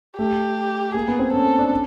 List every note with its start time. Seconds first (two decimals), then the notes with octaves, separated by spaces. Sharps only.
0.18 A3 G4
0.94 A#3 G#4
1.08 B3
1.19 C4
1.33 C#4 A4
1.46 C4
1.59 D4
1.71 C#4